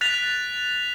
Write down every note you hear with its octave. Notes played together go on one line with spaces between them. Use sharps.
F#6 A6 B6 F7